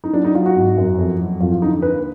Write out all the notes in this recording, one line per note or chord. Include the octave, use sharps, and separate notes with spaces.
D#4
F#3 D4
D#4
F#3 F4
F#4
G#1
F#2
F2
F#3
F2 F4
F4
D3 D#4
D#2 B4